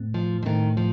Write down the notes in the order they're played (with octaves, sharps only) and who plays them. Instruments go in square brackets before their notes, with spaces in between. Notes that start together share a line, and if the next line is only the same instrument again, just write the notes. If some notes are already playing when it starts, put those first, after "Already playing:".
Already playing: [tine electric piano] A2 A3 C4
[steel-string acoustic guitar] F3
F3
[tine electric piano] A2 A3 C4 [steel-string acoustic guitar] D#3
[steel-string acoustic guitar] F3